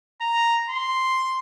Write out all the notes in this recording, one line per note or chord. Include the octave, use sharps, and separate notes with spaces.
A#5
C6